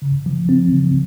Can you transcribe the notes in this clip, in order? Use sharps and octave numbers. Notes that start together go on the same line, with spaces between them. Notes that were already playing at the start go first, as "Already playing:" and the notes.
C#3
F3
C4
C#3